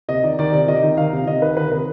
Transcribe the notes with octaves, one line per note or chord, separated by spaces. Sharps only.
C3 D#5
D#3 D5
D#3 D5
C3 D5
C3 D#5
D#3
D#3 F5
C3
C3 D#5
D#3 B4
D#3 B4
C3 B4